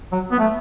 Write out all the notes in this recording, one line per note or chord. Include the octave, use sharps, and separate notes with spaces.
F#3
B3
A3